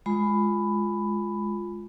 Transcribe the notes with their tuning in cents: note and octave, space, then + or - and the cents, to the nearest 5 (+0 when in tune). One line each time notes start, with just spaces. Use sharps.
G#3 +5 F4 +0 B5 +10